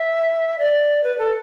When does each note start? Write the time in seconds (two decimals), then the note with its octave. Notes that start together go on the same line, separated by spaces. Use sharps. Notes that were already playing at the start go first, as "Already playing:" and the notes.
Already playing: E5
0.59 D5
1.04 B4
1.18 A4